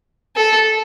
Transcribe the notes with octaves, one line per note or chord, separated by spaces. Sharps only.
A4